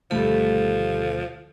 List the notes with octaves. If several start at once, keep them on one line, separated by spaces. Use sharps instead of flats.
D2 B2 D#3 F3 G3 A3 A4